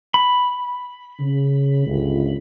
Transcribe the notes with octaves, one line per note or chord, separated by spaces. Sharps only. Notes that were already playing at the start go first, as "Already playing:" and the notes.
B5
C#3
G1 C#2